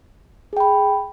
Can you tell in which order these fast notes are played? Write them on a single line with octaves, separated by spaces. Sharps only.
G#4 G5 B5